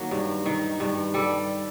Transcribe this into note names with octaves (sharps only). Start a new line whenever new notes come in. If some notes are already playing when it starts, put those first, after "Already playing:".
Already playing: D#3 F#3 A#3
G2
D#3
G2
G3 A4